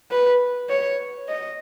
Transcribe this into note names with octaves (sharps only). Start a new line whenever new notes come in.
B4
C#5
D#5